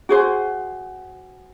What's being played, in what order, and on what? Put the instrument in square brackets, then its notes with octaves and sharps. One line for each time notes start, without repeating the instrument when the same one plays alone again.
[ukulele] F#4 G#4 C5